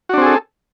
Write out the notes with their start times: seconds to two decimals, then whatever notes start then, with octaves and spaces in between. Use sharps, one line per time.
0.09 F#4
0.14 D4
0.18 C4
0.22 G#4
0.26 A4